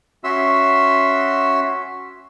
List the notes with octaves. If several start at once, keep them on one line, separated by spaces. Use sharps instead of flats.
C#4 F#4 E5 C6 E6